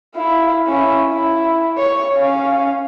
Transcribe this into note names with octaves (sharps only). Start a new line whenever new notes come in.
E4 F5
C#4 E4
E4
C#5
C#4 F5